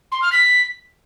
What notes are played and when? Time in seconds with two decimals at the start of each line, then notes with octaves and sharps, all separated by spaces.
0.12 C6
0.22 F6
0.32 B6